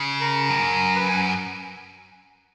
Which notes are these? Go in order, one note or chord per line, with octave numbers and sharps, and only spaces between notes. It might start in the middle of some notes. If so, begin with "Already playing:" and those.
Already playing: C#3
A#4
F2
F#2
B4
G#5